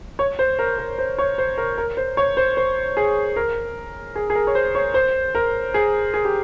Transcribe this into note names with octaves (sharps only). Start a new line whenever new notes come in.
C#5
C5
A#4
A#4
C5
C#5
C5
A#4
A#4
C5
C#5
C5
C5
G#4
A#4
G#4
G#4
A#4
C#5
C5
C#5
C5
A#4
G#4
G#4
G4